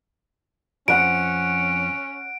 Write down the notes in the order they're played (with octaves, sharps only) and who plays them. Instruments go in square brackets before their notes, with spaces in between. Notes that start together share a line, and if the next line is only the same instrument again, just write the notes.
[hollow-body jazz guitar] F2 F3 [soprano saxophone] C#4 [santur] F#5 B5 [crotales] D7